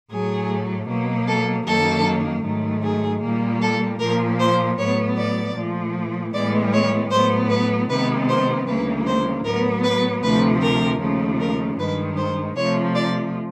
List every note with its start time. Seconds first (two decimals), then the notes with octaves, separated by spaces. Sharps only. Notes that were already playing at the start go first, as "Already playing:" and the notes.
0.10 A2 F#3 A3 G#4
0.88 B2 F#3 A#3
1.27 A4
1.66 F#2 D#3 F#3 A#3 A4
2.44 G#2 D#3 F#3 A3
2.83 G#4
3.21 A#2 G3 A#3
3.61 A4
3.99 A#2 F3 A#3 A#4
4.39 C5
4.77 A2 F#3 B3 C#5
5.16 D5
5.56 A#2 F3 A3
6.33 A2 E3 G#3 B3 D5
6.73 C#5
7.10 A2 F#3 B3 C5
7.49 B4
7.89 C3 D#3 G#3 B3 B4
8.28 C5
8.67 D2 C#3 E3 G3 A#3 B4
9.06 C5
9.44 A2 F#3 B3 A#4
9.83 B4
10.22 D2 C3 F3 A3 B4
10.61 A#4
11.00 D#2 C#3 F3 A3
11.40 A#4
11.77 G2 D#3 G#3 B4
12.16 C5
12.56 C3 F3 A3 C#5
12.95 D5